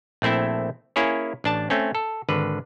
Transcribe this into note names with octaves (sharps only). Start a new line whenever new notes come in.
A#1 A3 C4 E4 E5
A#3 C#4 E4 G#4 C#5
A1 D4 A5
A3 C4 C#4
A4
G#1 D3 B4